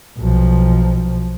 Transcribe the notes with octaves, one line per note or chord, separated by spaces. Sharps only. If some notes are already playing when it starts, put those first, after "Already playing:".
B1 F3